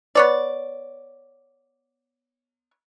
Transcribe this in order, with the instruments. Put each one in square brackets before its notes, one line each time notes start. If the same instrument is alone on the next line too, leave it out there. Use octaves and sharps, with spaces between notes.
[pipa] B3 C#5 D5